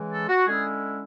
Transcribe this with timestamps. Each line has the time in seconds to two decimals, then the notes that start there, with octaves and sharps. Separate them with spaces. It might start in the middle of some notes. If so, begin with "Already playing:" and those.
Already playing: C#3 E3 G#3
0.11 A4
0.28 F#4
0.47 D3 G#3 C#4 E4 G#4